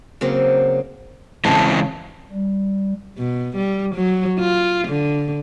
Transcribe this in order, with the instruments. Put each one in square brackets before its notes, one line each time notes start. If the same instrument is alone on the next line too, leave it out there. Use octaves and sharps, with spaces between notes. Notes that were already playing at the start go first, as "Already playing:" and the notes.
[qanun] C#3 F#3 A#3 C4
[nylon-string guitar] C#3 A5 [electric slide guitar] E3 G#3 C4
[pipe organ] G3
[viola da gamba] B2
G3
F#3
F4
D3